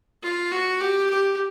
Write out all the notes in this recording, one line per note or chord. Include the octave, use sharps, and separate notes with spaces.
F4
F#4
G4
G4